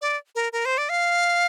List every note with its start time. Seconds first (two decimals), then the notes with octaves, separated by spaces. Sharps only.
0.02 D5
0.35 A#4
0.53 A#4
0.65 C5
0.78 D5
0.89 F5